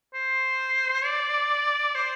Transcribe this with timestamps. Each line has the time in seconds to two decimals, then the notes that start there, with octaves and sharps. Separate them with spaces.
0.14 C5
1.05 D5
1.95 C5